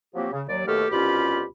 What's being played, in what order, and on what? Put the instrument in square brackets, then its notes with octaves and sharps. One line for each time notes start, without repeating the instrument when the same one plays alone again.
[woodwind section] F3 F#3 A#3 C4 F#4 G4
C#3
D#2 F#3 D5
D#2 B2 A3 G4 A4 F6
C2 B2 C#4 F4 G4 B5